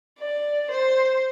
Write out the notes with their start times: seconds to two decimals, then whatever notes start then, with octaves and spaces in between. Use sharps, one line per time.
0.19 D5
0.71 C5